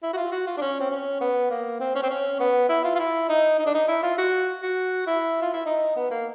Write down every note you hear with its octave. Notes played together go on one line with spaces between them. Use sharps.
E4
F#4
F4
F#4
F4
D4
C#4
C4
C#4
B3
A#3
C4
C#4
C4
C#4
B3
E4
F4
F4
E4
D#4
D#4
D4
D#4
E4
F4
F#4
F#4
E4
F4
E4
D#4
B3
A#3